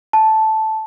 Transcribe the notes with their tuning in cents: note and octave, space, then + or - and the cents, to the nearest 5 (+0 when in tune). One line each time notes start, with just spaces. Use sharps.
A5 -5